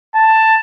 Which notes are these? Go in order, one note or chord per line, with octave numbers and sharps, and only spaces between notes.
A5